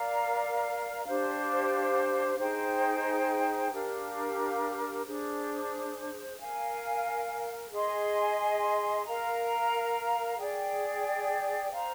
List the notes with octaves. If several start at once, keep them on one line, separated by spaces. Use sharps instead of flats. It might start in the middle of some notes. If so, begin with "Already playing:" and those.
Already playing: A#4 D5 F5 A#5
D4 G4 C5 F5
D#4 G#4 C5 G5
D4 G4 A#4 F5
D4 G#4 C5
A#4 F5 G#5
G#4 D#5 G#5 C6
A#4 F5 A#5
G#4 D5 G5
C5 F5 A#5